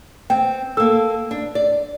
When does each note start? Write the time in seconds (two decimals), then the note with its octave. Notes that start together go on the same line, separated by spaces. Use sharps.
0.30 C4 G5
0.77 A#3 A4 E6
1.31 D4
1.55 D5